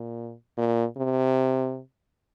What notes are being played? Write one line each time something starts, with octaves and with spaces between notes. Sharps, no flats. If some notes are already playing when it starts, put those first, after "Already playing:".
Already playing: A#2
A#2
C3